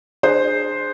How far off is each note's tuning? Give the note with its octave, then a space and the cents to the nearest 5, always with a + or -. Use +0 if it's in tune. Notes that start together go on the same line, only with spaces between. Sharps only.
D4 +30 G#4 +0 C5 +0